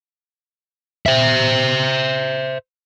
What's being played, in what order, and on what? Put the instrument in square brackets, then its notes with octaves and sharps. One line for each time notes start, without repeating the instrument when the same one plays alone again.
[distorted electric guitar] C5 E5